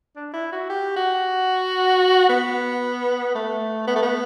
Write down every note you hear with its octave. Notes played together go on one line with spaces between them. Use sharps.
D4
E4
F#4
G4
F#4
B3
A3
B3
A3
B3